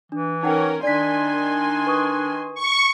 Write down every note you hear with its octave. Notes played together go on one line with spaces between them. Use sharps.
E3 D4
C#4 D#4 A#4 C#5 F#5 G5
D#3 D4 D5 G#5 C6 B6
B4 C#6 D#6
C#6